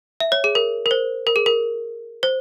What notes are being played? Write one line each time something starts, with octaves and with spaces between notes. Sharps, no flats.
E5
C#5
G#4
A#4
A#4
C5
A#4
G#4
A#4
C5